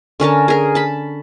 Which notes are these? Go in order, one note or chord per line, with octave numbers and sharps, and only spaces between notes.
D3 C#4 A#4 A5
G#4 A#4
A5 B5